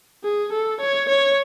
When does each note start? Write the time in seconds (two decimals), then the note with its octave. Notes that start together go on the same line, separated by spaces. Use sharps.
0.24 G#4
0.52 A4
0.81 C#5
1.09 C#5